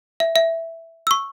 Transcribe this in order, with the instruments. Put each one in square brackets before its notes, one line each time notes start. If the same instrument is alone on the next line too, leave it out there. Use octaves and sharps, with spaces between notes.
[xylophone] E5
E5
E6
C#6